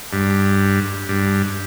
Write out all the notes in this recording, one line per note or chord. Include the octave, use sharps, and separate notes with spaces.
G2
G2